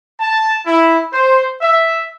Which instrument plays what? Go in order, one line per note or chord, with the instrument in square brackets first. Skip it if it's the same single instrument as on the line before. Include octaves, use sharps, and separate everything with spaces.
[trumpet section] A5
E4
C5
E5